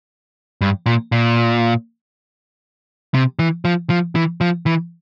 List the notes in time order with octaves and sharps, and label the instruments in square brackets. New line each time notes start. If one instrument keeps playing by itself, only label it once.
[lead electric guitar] G2
A#2
A#2
C3
E3
F3
F3
E3
F3
E3